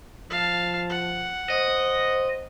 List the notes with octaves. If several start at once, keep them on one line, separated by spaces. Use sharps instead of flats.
F3 F5 A5
F#5
C5 D#5